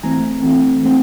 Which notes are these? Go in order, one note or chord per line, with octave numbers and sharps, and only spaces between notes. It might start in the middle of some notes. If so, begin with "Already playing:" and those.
E3 A3 C4 G#5 A#5
E3 A3 C4
E3 A3 C4